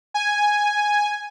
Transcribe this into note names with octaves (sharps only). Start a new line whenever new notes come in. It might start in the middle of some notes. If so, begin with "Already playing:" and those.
G#5